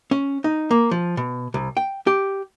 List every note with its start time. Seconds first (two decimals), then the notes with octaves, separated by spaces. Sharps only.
0.11 C#4
0.44 D#4
0.71 A#3
0.91 F3
1.17 B2
1.54 C2
1.77 G5
2.07 G4